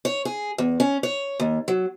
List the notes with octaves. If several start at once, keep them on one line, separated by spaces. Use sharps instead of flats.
C#5
G#4
E2
C#4
C#5
D#2
F#3